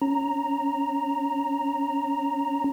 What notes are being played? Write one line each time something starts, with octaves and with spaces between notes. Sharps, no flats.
C#4 A#5